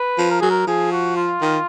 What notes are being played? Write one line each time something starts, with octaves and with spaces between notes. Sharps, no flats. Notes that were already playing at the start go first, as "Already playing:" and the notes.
Already playing: B4
F3
A#4
F#3 G#4
A#4
F3 G#4
F#4
F4
D#3